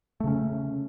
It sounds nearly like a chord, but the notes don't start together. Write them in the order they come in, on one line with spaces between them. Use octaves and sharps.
A3 C#3 C#4